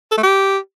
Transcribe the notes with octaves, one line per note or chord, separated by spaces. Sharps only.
A4
A3
G4